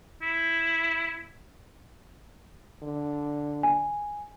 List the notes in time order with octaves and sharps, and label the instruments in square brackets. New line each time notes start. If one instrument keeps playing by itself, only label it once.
[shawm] E4
[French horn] D3
[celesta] G#5